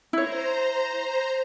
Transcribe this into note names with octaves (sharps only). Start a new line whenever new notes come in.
E4 C5 C#5 A#5